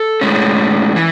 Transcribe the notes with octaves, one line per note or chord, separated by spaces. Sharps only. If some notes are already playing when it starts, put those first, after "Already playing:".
Already playing: A4
A2 G#3 C#4
E3